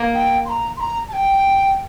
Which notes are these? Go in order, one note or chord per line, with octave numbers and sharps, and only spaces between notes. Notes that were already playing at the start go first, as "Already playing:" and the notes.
Already playing: A#3
G5
C6
A#5
C6
A#5
A5
G5